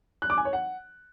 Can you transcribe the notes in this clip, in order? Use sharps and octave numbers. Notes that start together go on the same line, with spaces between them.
F#6
D6
G#5
C#5
F#5